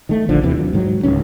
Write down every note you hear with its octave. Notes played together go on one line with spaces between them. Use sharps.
D#3 A3
A#1 D3 F3
D#2 C3 E3
F#3
G#2 D#3 F#3
D1 G1 C#2 C#4